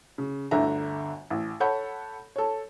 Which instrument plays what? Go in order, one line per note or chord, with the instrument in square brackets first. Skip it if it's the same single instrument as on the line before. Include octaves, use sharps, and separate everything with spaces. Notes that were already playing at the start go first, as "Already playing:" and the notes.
[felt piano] C#3
G1 D2 D3 E5 A#5
A1
A4 C#5 F#5 B5 G6
A4 C#5